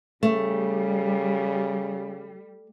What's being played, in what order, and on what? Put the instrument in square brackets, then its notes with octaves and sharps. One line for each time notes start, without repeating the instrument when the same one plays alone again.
[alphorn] C#3 [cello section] G3 [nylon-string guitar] A3